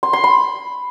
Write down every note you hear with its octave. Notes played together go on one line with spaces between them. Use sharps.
C6
C6
B5